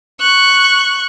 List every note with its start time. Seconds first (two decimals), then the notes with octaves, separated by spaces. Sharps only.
0.21 C#6 F#6